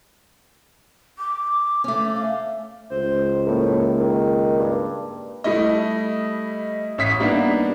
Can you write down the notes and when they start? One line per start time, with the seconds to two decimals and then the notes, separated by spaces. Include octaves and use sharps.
1.18 D6
1.84 A3 C#4
2.15 F5
2.91 C#2 C5
3.47 A2 A#3 A#4
3.97 D#3
4.59 G2
5.44 G3 A3 E4 D#5
6.98 A1 C#5 E5 D#6 B6 C7
7.20 G3 A#3 B3 D4 D#4